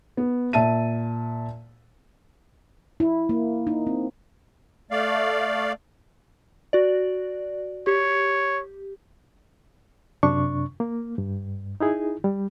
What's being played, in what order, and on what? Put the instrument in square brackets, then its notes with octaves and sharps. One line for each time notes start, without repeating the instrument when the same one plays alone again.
[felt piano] B3
A#2 E5 A5 D#7
[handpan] E4
A#3
D#4
C4
[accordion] A3 D5 F5
[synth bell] F#4 D5
[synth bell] G4 [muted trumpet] C#5
[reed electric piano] F#2 C3 D4 C#6
A#3
G2
D#4 E4 G#4
G3